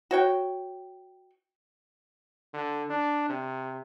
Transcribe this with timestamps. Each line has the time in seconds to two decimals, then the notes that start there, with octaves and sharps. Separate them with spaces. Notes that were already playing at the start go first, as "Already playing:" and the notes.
0.11 F#4 C#5 G5
2.54 D3
2.90 D4
3.29 C3